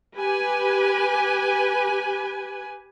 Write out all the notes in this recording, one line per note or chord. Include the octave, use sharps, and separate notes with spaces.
G4 B4 G#5